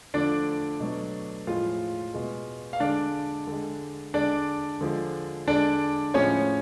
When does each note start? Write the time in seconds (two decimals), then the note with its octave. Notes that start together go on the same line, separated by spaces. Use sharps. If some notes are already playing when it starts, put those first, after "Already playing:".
0.14 D3 F3 A3 D4 D5
0.80 B2 F#3 A3
1.47 A2 F3 G#3 F4 F5
2.14 B2 G#3
2.73 F5
2.80 D3 G#3 D4 D5
3.47 D3 G#3
4.14 D3 G#3 D4 D5
4.81 D3 F3 G#3
5.47 D3 G#3 D4 D5
6.14 A2 F3 G#3 C#4 C#5